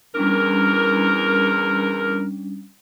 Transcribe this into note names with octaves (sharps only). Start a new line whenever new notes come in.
E2 G3 C#4 D4 A#4